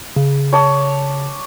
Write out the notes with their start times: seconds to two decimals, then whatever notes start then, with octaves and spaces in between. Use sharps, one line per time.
0.16 C#3
0.53 C#5 A5 D6